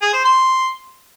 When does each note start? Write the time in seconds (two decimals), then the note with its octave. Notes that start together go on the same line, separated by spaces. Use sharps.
0.02 G#4
0.14 C5
0.25 C6